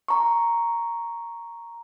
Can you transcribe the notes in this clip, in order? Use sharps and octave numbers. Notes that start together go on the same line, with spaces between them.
A#5 C#6